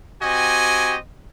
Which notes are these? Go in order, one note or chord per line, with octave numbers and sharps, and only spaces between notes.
C4 F#4 G4 D#5 G#5